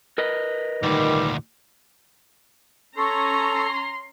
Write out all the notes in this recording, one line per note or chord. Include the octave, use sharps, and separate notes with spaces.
A#4 B4 D#5
D2 A#2 D#3 G3
C#4 A4 A#5 C6 C#6